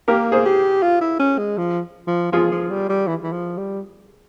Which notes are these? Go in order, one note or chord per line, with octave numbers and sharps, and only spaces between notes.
A#3 G4 A#4
G#4 C5
G4
F4
E4
C#4
G#3
F3
F3
F3 F4 G#4
F3
G3
G3
E3
E3
F3
G3